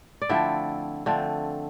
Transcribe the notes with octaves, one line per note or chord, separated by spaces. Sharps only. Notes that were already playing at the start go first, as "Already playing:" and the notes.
D5
D3 F3 A3 C4 E4 E5
D3 F3 A3 C4